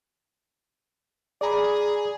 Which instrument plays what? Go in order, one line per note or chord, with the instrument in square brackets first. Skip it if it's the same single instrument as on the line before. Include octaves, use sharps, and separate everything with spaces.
[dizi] G#4 [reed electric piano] D5 A#5 B5